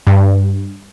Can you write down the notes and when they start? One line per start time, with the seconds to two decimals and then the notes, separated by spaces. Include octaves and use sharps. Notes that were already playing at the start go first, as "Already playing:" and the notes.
0.07 G2